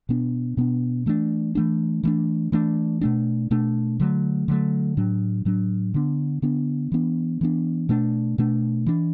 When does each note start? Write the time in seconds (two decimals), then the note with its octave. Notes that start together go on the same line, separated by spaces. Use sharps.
0.09 B2 B3 D4
0.57 B2 B3 D4
1.06 E3 A3 D4
1.55 E3 A3 D4
2.03 E3 A3 D4
2.52 E3 A3 D4
3.01 B2 A3 D4
3.51 B2 A3 D4
4.00 D3 F#3 A3
4.48 D3 F#3 A3
4.97 A2 F#3 D4
5.45 A2 F#3 D4
5.94 D3 B3 D4
6.42 D3 B3 D4
6.92 E3 B3 D4
7.41 E3 B3 D4
7.89 B2 A3 D4
8.38 B2 A3 D4
8.86 E3 D4